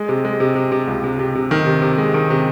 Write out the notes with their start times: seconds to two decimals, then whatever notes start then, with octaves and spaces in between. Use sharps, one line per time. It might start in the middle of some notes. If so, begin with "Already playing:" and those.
Already playing: G#3
0.09 C3
0.25 G#3
0.40 C3
0.55 C3
0.72 C3
0.88 C#2
1.04 C3
1.19 C3
1.35 C3
1.51 D#3
1.66 C3
1.82 C3
1.98 G#3
2.14 D#3
2.30 C3